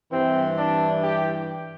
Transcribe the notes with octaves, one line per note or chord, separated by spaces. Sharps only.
G2 E3 C4
D4
G4